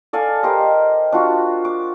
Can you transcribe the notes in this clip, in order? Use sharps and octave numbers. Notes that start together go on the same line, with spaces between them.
A4 D5 F5 G#5
G4 A#4 C5 D#5
D4 F4 F#4
D6